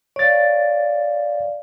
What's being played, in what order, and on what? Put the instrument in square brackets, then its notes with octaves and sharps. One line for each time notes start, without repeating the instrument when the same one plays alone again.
[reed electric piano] C#5 A6 [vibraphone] D5 F5